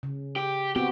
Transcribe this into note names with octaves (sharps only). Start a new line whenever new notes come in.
C#3
G4
B3 C4 F#4 G4